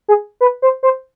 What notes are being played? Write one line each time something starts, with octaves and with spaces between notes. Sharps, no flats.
G#4
B4
C5
C5